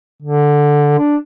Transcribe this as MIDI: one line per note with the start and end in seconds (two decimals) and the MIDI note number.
0.23 0.99 50
0.99 1.16 62